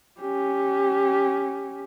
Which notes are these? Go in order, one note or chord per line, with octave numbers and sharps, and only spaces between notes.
C#4 G4